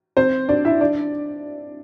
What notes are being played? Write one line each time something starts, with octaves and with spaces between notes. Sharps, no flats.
C4 C5
D4 D5
E4 E5
D4 D5